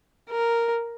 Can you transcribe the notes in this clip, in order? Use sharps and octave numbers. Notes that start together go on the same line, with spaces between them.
A#4